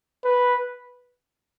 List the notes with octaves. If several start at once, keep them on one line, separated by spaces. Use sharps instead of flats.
B4